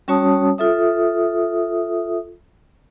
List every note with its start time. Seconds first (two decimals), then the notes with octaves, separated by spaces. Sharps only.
0.08 G3 C#4 F#4 C#5 A5 D#6
0.58 F4 A4 E5 D#6